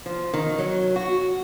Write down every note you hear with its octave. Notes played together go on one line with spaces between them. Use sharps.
F3
D#3
F#3
F#4